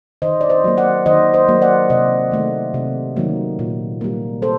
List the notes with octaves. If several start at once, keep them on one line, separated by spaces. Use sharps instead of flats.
D#3 C5 D#5
D5
C5 D#5
F#3 A#3
D5 F#5
D#3 C5 D#5
C5 D#5
F#3 A#3
D5 F#5
C3 C5 D#5
D#3 A3
C3
D#3 F#3 A#3
A#2
G3 A#3
A4 C5